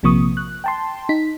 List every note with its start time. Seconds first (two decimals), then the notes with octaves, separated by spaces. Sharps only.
0.03 A#1 C3 F3 A#3 C#6 D#6
0.37 F#6
0.64 G5 A5 C6
1.09 D#4 B6